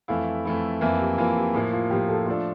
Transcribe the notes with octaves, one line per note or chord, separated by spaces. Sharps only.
F2 E3 A3 E4 F5
F2 E3 A3 E4
F2 E3 A#3 E5
G4
F2 E3 A#3 F4
G4
A2 F3 A#3
F4
A2 F3 A#3 G4
A4
F3 A3 D4 F4 A4